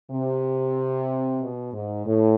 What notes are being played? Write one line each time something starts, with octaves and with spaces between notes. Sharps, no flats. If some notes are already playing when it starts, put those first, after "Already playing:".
C3
B2
G#2
A2